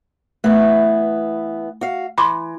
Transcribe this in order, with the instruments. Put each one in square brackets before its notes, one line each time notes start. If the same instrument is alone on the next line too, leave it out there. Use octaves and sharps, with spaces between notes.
[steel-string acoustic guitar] E3 B3 [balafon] A3
[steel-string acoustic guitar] F#4 F5
[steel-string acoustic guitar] E3 [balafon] B5 C6 D6